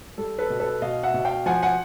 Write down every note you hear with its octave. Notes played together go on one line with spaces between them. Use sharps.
G3 A4
A4 B4
B2
A4 B4
B2 D#5 F5
E5 F#5
B2
F5 G5
F3 F#5 G#5
F#5 G#5